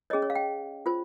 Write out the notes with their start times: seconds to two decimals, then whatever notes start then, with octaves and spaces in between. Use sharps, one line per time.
0.10 C#4 G#4 C#5 D#5
0.22 C#5
0.30 F5
0.35 G5
0.86 F4 C5